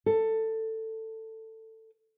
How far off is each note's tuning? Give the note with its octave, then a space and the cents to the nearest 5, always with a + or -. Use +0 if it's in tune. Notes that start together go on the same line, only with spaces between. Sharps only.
A4 +15